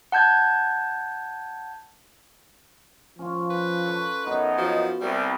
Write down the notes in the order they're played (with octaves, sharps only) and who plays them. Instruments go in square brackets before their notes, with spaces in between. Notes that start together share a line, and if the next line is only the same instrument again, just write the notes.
[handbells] F#5 A5 G6 G#6
[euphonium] F3 [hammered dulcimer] C#4 F4
[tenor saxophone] B4
[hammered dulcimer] A4 C#5
[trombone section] F#2 D#4 [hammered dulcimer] B3
[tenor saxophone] F3 [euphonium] F#4
[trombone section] C2 [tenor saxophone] G3